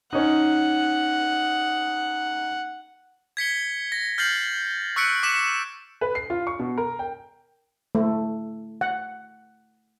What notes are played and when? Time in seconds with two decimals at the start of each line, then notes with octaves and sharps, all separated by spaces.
0.13 C#4 D#4 F#5
3.37 G#6 B6 C#7 G7
3.92 A#6
4.18 F6 G6 A6 C7 F#7
4.96 C#6 E6 F#6 B6 C#7 D7
5.23 D6 B6 E7
6.01 B4
6.15 C7
6.30 F4
6.47 C#6
6.59 B2
6.78 A#4
6.99 G5
7.95 A3
8.81 F#5